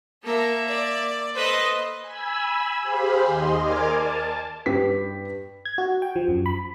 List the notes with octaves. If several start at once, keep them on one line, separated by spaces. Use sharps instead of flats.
A#3 A4 A#4 E5
D5
A4 B4 C5 D#5
G#5 B5 E6
G4 G#4 C5 F5 B5
D#2 D#5 C6
A#4 D5 G#5 D6 F6 G#6
A5
G2 G4 B4 B6
G#6
F#4
G5
F3
F#2
B5